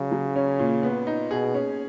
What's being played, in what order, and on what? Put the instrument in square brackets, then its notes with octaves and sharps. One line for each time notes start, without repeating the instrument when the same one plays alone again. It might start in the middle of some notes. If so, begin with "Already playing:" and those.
Already playing: [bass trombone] C#3 [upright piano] F#3
[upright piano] F#3
C#4
A#2
B3
D#4
[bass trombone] B2 [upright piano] G#4
[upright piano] C#4